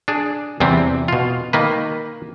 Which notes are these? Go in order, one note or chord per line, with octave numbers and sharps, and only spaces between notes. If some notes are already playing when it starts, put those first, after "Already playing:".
D4 G#4
E2 C3 E3 G3 C4
B2 F4
D#3 A#3 B4